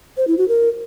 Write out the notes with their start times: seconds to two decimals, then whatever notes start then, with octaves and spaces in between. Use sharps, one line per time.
0.17 C5
0.27 E4
0.38 F#4
0.48 A#4